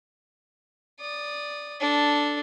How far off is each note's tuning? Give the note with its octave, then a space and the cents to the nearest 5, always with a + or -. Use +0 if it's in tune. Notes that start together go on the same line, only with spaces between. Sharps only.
D5 +0 D#6 -20
D4 -5 A4 +0